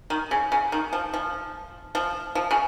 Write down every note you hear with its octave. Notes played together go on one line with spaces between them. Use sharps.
D#3
C#3
C#3
D#3
F3
F3
F3
F3
C#3